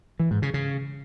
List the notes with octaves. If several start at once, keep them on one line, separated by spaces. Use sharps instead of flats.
E3
G#2
C#3
C#3